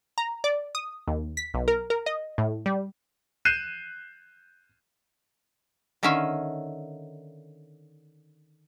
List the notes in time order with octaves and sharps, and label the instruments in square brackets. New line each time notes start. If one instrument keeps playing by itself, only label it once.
[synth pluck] A#5
D5
D#6
D#2
B6
B1
A#4
A#4
D#5
A2
G3
[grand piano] F#6 G6 C7 D#7 E7
[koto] D3 D#3 C#4 E5 F5 G#5